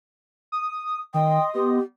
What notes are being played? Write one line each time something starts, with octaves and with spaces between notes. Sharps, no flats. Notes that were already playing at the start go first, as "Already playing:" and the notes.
D#6
D#3 D#5 G5 C6 D#6
B3 G4